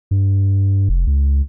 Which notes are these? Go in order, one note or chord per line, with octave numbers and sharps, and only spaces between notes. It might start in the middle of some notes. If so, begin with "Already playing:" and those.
G2
F1
C#2